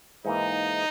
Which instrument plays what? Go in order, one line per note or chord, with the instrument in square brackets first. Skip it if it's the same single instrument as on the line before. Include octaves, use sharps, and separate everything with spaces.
[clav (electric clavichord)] G#2 E3 A#3 [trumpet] D#4